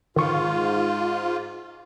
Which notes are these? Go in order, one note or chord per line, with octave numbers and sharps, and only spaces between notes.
G#2 D#3 F4 C#6 C#7